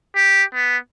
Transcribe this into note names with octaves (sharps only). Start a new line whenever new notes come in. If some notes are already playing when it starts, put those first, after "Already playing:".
G4
B3